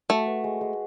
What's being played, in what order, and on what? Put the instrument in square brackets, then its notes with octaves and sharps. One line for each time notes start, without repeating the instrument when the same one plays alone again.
[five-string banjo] A3 [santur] F#4
[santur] B4
G#3
G#3